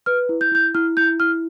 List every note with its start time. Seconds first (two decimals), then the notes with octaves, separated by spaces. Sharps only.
0.06 B4 F6
0.29 E4
0.41 G6
0.52 E4 G6
0.75 E4 F6
0.97 E4 G6
1.20 E4 F6